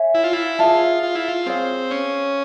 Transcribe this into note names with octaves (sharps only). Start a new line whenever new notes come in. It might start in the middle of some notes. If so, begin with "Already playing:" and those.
Already playing: C#5 E5 G#5
E4
F4
E4
F4 G#4 C#5 E5 A5
F4
E4
F4
C4 G#4 C#5 F5
C#4